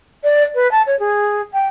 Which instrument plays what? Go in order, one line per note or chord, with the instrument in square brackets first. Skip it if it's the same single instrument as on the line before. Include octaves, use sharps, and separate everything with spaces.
[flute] D5
B4
A5
C#5
G#4
G5